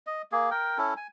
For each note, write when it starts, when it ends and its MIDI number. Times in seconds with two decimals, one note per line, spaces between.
0.07 0.22 75
0.32 0.50 58
0.32 0.50 68
0.51 0.78 70
0.51 0.78 79
0.78 0.94 61
0.78 0.94 64
0.78 0.94 69
0.97 1.07 80